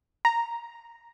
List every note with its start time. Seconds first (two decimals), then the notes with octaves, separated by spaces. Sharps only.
0.25 A#5